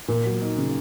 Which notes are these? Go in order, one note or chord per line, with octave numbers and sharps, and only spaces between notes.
A#2 A#3
F#3
D#4
C#3